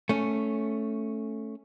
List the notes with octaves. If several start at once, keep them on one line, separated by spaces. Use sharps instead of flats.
A3 C#4